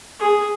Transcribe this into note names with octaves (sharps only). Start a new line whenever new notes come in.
G#4